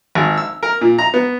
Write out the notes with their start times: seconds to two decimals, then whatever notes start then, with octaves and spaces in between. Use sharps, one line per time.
0.15 G#1
0.37 E6
0.63 A#4
0.81 A#2
0.98 A#5
1.14 B3